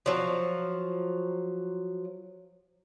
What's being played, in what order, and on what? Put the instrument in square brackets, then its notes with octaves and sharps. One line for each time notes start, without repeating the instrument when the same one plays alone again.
[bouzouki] F3 F#3